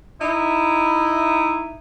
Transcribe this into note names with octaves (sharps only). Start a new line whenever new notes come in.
D#4 E4